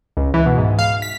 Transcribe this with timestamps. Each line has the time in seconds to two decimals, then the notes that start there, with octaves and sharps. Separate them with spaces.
0.17 C#2
0.34 E3
0.46 B2
0.58 G#2
0.79 F5
1.02 B6